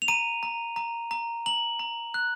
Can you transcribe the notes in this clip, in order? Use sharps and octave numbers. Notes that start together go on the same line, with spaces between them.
F7
A#5 D#7
A#5
A#5
A#5
A#5 F#7
A#5
F#6